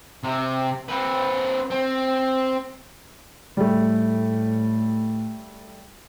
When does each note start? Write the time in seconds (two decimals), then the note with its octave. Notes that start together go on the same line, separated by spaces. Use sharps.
0.23 C3
0.89 C4 B4
1.71 C4
3.57 A2 G3 A3